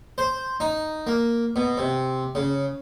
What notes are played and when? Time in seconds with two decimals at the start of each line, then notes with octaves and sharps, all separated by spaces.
0.18 C5
0.60 D#4
1.07 A#3
1.56 B2
1.78 C3
2.35 C#3